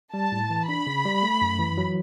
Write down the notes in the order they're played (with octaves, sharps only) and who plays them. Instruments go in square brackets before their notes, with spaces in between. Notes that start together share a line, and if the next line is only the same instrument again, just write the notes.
[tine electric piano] G3 [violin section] A5
[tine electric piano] A2
E3
[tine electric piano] D4 [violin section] B5
[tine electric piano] C#3
G3
A3
F#2
E3
F#3